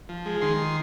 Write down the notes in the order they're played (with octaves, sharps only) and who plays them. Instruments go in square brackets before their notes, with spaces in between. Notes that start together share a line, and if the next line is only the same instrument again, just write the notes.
[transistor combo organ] F3
G#3
D#3 C6